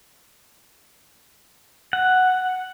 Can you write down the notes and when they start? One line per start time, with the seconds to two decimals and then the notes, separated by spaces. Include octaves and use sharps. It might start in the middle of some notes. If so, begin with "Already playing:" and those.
1.93 F#5